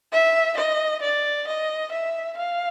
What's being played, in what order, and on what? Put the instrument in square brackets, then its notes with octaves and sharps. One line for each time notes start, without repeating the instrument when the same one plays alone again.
[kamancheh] E5
D#5
D5
D#5
E5
F5